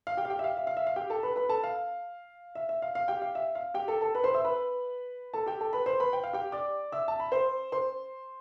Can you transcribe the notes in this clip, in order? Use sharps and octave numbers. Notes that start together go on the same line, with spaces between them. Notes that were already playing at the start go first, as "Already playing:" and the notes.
F5
G4 G5
F5
G4 G5
E5
F5
E5
F5
E5
F5
G4 G5
A4 A5
B4 B5
B4 B5
A4 A5
F5
E5
E5
F5
F5
G4 G5
F5
E5
F5
G4 G5
A4 A5
A4 A5
B4 B5
C5 C6
E5 E6
B4 B5
A4 A5
G4 G5
A4 A5
B4 B5
C5 C6
B4 B5
G5
F5
G4 G5
D5 D6
E5 E6
A5
B5
C5 C6
C5 C6